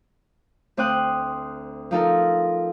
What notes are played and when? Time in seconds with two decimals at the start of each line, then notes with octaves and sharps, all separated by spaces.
0.77 D2 C4 C5 G5 D#6 F#6
1.91 F3 D#4 A4 A#4